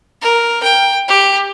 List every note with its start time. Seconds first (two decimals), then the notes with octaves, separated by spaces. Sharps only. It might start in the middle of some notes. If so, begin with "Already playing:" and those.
0.21 A#4
0.63 G5
1.08 G4